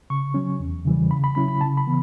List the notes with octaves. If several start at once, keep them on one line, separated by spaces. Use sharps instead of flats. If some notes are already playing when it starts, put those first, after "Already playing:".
C#3 C#6
F#3 C#4
E2
C#3 E3 G3
C#3 B5
B5
F#3 C#4 E4 B5
B5
C#3 A5
B5
E3 B3